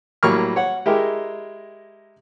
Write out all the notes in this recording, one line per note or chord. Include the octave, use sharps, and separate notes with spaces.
A2 F#3 G3 A#3 C#6 F6
C#5 F#5
G#3 E4 G4 A#4